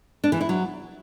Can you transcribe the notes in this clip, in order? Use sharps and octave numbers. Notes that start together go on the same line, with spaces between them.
D4
E3
E4
F#3